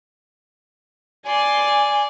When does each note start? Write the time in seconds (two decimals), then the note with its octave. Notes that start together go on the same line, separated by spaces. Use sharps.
1.27 D5 G#5 C6